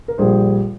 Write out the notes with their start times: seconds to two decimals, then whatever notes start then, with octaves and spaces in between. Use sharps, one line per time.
0.08 A#4
0.18 A#1 A#2 G3 G#4 C5